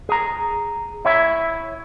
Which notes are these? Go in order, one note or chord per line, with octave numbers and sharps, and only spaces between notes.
G#4 A#5
E4 C#5 E5